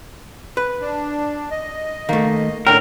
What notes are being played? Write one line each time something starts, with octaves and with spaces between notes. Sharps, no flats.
B4
D4
D#5
D#3 A3 A#3
A2 D3 C#4 A#4 G5